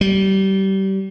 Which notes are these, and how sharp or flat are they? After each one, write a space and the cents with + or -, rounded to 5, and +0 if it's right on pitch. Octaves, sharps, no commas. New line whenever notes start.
G3 -25